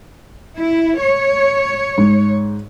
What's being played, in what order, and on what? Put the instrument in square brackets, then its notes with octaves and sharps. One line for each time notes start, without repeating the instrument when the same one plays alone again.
[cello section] E4
C#5
[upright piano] G#2